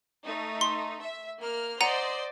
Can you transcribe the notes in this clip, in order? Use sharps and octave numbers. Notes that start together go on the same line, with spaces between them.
A3 D#4
C6
E5
A#3 F6
C5 D5 D#5 F#5 A#5 D#7